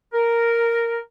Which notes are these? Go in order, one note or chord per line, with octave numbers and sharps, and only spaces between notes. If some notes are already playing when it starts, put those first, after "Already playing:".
A#4